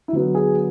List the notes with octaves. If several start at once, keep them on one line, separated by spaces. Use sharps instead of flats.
E4
D3 F#3 B3 F#4
G#4